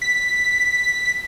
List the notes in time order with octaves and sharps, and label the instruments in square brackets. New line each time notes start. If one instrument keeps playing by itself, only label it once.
[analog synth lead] B6